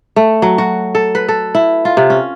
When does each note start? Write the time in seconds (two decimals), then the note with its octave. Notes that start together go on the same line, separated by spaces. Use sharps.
0.16 A3
0.42 F#3
0.58 F#4
0.95 A4
1.15 B4
1.29 A4
1.55 E4
1.85 F4
1.97 C3
2.10 C#4